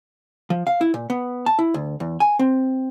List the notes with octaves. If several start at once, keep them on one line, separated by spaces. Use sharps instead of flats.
F3
F5
E4
A#2
B3
A5
E4
D2
E2
G#5
C4